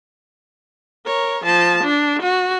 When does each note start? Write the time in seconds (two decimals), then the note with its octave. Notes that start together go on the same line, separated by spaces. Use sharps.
1.06 A#4 C#5
1.44 F3 A5
1.84 D4
2.22 F#4